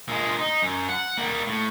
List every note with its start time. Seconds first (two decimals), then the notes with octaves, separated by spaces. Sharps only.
0.08 A#2 G#3
0.39 D#4
0.62 F#2
0.89 F#5
1.18 G3 A#3
1.47 A2